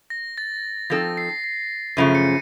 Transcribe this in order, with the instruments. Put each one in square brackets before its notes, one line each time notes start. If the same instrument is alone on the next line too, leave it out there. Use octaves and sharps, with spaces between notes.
[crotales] A#6
A6
[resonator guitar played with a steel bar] F3 C4 D#4 A4 [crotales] A#6
[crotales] C7
C7
[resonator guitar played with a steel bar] F#2 C#3 F3 A3 [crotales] D#7
[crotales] C#7